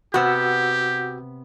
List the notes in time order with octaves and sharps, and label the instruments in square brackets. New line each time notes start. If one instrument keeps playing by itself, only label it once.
[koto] C3 B3 [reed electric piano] F#4 F#5 E6 [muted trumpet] G4